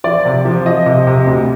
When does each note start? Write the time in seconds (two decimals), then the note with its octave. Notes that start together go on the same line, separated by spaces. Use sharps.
0.04 F3 D5
0.25 C3
0.45 F3
0.66 F3 D#5
0.86 C3
1.07 C3
1.27 D2